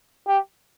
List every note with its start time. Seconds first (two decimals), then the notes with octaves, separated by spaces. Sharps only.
0.27 G4